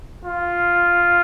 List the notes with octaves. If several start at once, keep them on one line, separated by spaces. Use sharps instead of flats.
F4